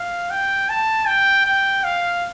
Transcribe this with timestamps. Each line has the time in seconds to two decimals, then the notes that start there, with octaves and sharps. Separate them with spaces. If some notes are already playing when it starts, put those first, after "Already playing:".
Already playing: F5
0.30 G5
0.69 A5
1.07 G5
1.45 G5
1.84 F5